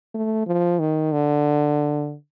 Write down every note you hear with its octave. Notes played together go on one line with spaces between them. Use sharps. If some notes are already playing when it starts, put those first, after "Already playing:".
A3
F3
D#3
D3